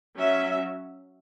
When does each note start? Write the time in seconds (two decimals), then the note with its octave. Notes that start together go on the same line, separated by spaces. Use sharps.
0.17 F#3 C#4 E5